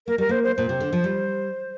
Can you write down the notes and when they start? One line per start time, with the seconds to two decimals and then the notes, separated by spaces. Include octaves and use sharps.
0.07 A#3 A#4
0.18 G3 A#4
0.29 A#3 C5
0.44 C5
0.56 A#2 C5
0.69 C3
0.80 D3
0.93 F3
1.04 G3